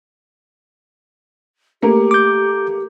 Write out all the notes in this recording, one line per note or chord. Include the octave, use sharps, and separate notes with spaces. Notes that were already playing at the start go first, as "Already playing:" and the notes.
A3 A#3 G4 A#4
D6 G6